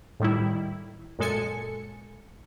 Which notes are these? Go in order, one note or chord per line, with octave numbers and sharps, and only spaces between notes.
A2 D#3 G3 E4
F#2 A#2 G#3 A4 G#5 C#7